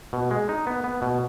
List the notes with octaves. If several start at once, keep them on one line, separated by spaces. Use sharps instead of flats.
B2
G#3
D#4
B3
B3
B2